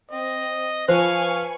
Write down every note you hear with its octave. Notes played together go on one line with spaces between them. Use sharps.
C4 D#5
F3 B4 C5 F5 G#5 C#6